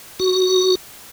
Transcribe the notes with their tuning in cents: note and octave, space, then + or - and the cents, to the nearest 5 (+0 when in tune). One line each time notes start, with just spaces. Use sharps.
F#4 +5